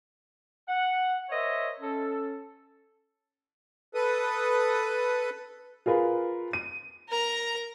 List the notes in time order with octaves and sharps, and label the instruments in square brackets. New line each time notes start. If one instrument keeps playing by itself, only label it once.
[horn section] F#5
A#4 C5 C#5 D#5 E5
C#4 A4
[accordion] A4 B4 D#6
[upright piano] F4 G#4 A#4 B4
D#7
[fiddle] A#4 A#5